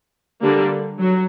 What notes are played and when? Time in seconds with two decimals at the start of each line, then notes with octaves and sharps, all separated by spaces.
0.41 D3 G3 A#3 D4
0.98 F#3